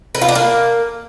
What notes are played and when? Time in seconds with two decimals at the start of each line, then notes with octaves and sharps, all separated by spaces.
0.15 B4
0.22 F4
0.28 D4
0.35 A#3